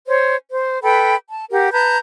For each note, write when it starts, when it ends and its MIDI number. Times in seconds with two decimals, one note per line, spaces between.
0.08 0.36 72
0.08 0.36 73
0.51 0.79 72
0.83 1.15 69
0.83 1.15 71
0.83 1.15 79
0.83 1.15 83
1.30 1.44 81
1.51 1.70 67
1.51 1.70 70
1.51 1.70 78
1.72 1.97 71
1.72 1.97 81
1.72 1.97 82
1.72 1.97 91